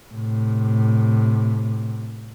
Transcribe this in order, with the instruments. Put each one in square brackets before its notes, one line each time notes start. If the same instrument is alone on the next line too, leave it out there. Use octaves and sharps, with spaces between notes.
[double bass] A2 C3